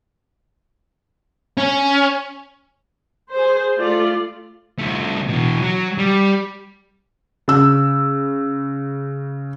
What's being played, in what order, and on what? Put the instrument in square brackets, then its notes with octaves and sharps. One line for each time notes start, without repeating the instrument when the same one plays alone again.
[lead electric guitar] C#4
[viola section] G#4 C5
A3 F4 D5
[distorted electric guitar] C2 A3
B2 E3
F#3
G3
[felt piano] C#3 E6